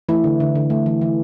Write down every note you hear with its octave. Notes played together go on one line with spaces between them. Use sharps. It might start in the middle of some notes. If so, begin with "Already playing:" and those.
E3 A3 E4
D3
D3
D3
A3
E3
E3